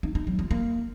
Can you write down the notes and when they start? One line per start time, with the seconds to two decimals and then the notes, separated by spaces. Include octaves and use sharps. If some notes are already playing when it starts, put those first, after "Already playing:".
0.03 D#4
0.15 D#4
0.27 F#3
0.39 F4
0.51 A#3